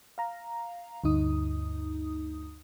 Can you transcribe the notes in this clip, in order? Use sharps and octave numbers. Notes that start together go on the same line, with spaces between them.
F5 A#5
D2 G2 D#4 D#6